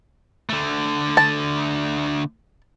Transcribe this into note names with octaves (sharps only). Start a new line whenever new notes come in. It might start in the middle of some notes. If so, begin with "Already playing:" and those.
D3 A3
A5